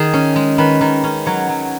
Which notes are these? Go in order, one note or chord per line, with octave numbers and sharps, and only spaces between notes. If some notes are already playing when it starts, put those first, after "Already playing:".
Already playing: D#3 G#4
C#4
G#3
D#3 B4
D#3
C#4
F#3 C#5
F#3